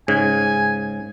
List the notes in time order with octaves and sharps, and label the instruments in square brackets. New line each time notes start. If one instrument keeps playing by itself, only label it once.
[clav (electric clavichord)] G#2 C#3 [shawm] G#5